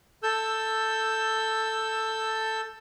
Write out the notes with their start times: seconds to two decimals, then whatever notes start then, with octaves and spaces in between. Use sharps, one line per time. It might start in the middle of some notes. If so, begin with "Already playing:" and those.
0.23 A4 E6 G6